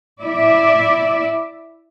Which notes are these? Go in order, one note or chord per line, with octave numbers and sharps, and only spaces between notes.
E4 D5 E5